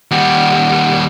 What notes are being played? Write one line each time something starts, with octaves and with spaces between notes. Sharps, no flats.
D#2 G3 F#5